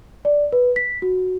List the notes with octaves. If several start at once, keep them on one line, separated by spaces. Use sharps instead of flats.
D5
B4
B6
F#4